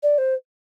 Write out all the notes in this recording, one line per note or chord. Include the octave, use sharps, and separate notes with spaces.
D5
C5